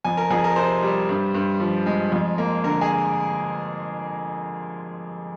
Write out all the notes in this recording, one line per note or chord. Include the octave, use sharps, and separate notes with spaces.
F2 G#5
A#4
F2 G#4
A#4
C3 C5
G3
G2
G2
F3
G#3
F2
A#3
D3 A#4
G#4